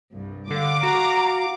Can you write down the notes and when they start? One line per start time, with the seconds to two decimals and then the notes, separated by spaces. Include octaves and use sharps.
0.11 C2 G2
0.51 D3 F5 F#5 D6
0.83 F#4 A#5